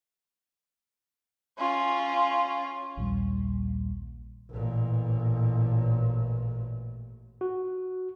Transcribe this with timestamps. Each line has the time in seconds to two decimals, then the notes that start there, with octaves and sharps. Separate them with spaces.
1.59 C#4 F4
2.97 A#1 D#2 A#2 G3
4.51 A1 A#2
7.41 F#4